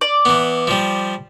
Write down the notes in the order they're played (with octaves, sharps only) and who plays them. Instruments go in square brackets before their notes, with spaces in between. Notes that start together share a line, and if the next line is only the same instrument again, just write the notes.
[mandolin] D5
[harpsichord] E3 B3
F3 G3